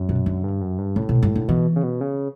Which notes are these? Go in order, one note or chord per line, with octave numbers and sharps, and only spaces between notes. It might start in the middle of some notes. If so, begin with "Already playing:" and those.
Already playing: F#2
B2
D3
G2
F#2
G2
A2 C#3
B2
G2
D3
B2 E3
C#3
B2
C#3